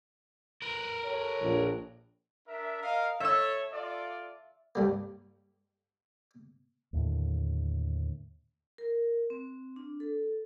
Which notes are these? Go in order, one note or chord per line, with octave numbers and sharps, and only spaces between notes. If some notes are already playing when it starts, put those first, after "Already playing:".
A#4 B4
G4 A4 C#5
A#1
D4 A#4 E5
A#4 D#5 F5
A4 C#5 E5 E6
F4 A4 D5
G2 G3 A#3
D#2 A2 D3
A#4
C4
D4
A4